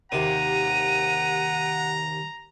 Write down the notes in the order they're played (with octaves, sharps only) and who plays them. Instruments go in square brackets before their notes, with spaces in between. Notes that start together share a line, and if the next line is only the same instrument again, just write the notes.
[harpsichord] D#2 C3 D6 [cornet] F#5 [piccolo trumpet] A#5 [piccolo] D#7